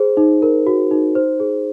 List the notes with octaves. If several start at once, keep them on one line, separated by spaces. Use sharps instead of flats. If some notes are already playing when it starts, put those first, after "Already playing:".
Already playing: G#4 C5
D#4
A#4
F#4
D#4
C5
G#4